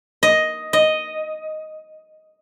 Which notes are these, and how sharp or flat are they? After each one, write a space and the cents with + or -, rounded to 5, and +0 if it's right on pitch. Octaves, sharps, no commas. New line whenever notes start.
D#5 +5
D#5 +0